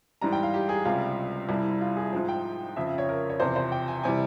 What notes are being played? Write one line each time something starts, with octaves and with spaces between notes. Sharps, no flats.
G#2 E3 G3 A#5
G5
F5
G4
G#4
C#2 C3 G3 F4
C2 C3 G3 E4
E4
E4
F4
G#4
G#2 F3
G5
F2 C#3 F3 E5
E5
C#5
A#4
C#5
E2 C3 F3 C5
C5
G5
G#5
C3 E3 G3 G#5